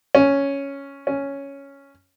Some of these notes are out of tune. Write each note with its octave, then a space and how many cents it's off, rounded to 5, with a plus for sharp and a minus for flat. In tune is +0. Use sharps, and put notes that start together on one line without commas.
C#4 +5
C#4 +5